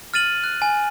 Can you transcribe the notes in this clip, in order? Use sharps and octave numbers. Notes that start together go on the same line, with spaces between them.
F6 A6 D#7 F#7
F#6
G#5